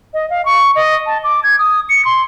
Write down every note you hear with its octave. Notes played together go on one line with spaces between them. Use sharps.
D#5
F5
C#6
D#5
A5
D6
G#6
D#6
C#7
C6